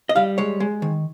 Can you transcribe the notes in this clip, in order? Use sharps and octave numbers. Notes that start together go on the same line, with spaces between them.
D#5
G3 F5
G#3 C#5
G#3
D#3